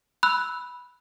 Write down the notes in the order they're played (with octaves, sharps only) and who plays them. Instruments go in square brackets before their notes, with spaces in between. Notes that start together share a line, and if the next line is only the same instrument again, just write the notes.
[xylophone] B5 E6 F#6